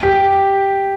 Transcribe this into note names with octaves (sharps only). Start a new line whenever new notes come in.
G4